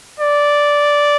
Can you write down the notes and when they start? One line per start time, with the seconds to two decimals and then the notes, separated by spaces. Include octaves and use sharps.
0.19 D5